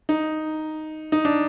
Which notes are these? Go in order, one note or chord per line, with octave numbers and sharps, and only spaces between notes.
D#4
D#4
D4